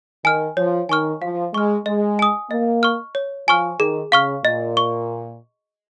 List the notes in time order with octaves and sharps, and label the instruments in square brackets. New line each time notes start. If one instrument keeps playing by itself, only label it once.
[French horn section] D#3 [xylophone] G#5 F6
[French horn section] F3 [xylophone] C#5
[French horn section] D#3 [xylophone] G#5 C#6 F6
[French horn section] F3 [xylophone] F5
[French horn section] G#3 [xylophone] C#6 F6
[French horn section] G#3 [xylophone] D#5
[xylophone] G#5 D#6
[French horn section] A#3 [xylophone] D#5
[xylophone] C#6 F6
C#5
[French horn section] F3 [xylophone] G#5 C#6 F6
[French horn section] D#3 [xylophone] G#4
[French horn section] C#3 [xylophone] F5 C#6 F6
[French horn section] A#2 [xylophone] D#5
[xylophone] C#6